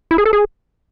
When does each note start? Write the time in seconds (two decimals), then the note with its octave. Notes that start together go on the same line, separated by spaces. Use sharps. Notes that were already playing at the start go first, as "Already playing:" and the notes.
0.11 E4
0.18 G#4
0.25 A4
0.33 G#4